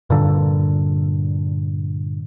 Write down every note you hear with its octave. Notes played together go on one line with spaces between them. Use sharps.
G2 A#2 D3